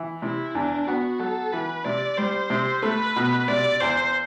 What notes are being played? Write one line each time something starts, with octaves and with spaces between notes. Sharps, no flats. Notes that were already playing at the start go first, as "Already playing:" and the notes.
Already playing: E3
C3 E4
E2 D4
B3 F#4
F#3 A4
E3 B4
C3 D5
G3 C5
C3
A3 B4
B2
C3 D5
E2 C5